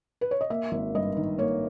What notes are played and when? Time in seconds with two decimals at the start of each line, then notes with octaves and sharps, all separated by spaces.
0.21 B4
0.31 C#5
0.41 D#5
0.50 A#3 E5
0.72 G#1
0.95 G2 D#5
1.17 D#3
1.38 A#3 C#5